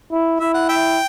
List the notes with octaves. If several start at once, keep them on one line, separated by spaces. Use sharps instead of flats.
E4
E4 E5
F#5
E5 G5